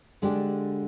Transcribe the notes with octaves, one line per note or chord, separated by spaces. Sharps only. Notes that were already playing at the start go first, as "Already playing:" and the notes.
D3 G#3 D4 G4